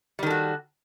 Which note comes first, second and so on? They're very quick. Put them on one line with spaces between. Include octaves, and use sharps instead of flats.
G3 D#3 A4 F#4